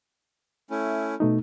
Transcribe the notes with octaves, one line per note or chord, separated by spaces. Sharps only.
A3 C#4 E4
B2 A3 D#4